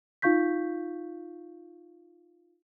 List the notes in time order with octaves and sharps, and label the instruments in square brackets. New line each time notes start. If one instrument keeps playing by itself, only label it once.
[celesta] D#4 F4 F5 C#6 G6 B6